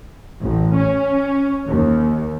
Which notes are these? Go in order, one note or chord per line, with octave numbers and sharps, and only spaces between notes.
A1
C#4
D#2